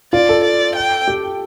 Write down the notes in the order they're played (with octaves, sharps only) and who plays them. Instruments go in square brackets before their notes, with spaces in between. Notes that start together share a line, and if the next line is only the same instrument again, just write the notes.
[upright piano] F4 [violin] D5
[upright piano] A4
[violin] D5
G5
[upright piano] G4